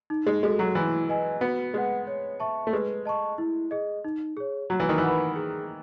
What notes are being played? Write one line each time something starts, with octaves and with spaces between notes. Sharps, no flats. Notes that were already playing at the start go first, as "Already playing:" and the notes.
D#4
G#3
G#3 F#4 A4
F#3
E3 E4
B4 D#5 G#5
B3 F#4
G#3 B4 F#5
C#5
E5 A5 C#6
A3
G#3 B4
D#5 A5 C#6
E4
G#4 D#5
D#4
G#4 C#5
F#3 F#4
E3
D#3
E3
B4 F#5 B5
G#4